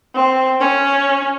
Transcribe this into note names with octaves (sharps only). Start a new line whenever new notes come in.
C4
C#4